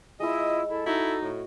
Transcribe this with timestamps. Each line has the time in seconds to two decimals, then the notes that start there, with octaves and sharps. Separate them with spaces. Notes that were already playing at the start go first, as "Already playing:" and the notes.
0.20 G#3 E4 F4 D#5 E6
0.68 E4 A4
0.86 D#4 E4 F#4
1.23 A2